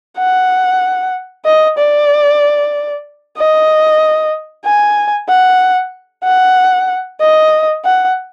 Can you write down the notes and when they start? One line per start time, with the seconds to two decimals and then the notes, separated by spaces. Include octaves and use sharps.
0.18 F#5
1.46 D#5
1.78 D5
3.38 D#5
4.65 G#5
5.28 F#5
6.24 F#5
7.21 D#5
7.85 F#5